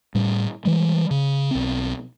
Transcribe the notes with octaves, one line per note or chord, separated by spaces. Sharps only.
A2 G3
E3 G3 G#3
C#3
B1 C4